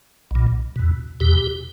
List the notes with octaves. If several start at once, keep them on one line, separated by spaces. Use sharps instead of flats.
B1 A#2
E2 B2
E2 B2 G4